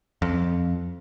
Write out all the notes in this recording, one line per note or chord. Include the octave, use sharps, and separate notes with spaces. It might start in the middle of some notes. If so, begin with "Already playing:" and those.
F2